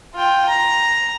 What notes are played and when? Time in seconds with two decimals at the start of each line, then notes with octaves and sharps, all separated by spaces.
0.16 F4 G5
0.48 A#5